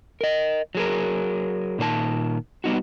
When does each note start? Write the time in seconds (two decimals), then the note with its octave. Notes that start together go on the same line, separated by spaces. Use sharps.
0.21 A#4 D#5
0.75 F#3 G#4 A#4
1.79 A#2 D#3 C5 A5
2.64 G3 B3 D#4 F#4